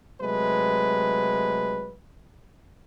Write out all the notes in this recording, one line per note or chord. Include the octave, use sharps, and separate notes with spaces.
C3 F#3 G#3 A3 B4